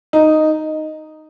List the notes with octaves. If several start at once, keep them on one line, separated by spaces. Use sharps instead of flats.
D#4